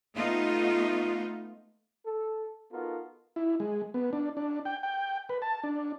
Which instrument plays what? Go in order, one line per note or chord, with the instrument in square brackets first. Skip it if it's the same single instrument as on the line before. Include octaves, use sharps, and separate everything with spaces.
[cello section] A3 B3 D#4 F4
[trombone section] A4
B3 D#4 F4 F#4 A4 A#4
[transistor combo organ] E4
G#3
B3
D4
D4
G5
G5
B4
A5
D4